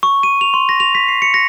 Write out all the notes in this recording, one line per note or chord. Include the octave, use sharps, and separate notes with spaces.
C#6
D#7
F7
C6
A#6
F7
B6
C7
C#7
A#6